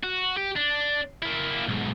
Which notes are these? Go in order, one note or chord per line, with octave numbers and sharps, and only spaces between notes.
F#4
G4
D4
A#3 E4
B1 G#2